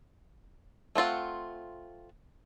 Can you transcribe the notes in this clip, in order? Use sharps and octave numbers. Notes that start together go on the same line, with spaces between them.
A3 C4 F4 F#5